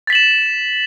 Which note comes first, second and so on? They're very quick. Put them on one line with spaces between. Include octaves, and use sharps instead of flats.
A6 B6 F#7 E7